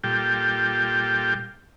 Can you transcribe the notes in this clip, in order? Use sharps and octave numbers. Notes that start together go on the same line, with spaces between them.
A#2 G3 F4 G4 A4 G5